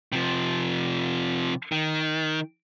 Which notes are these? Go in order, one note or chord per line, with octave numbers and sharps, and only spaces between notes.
C3 F3
D#3